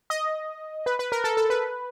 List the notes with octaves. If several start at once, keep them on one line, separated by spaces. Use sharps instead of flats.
D#5
B4
B4
A#4
A4
A4
B4